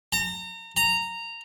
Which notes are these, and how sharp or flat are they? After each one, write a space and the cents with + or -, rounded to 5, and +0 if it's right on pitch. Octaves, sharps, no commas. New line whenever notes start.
A#5 -35
A#5 -10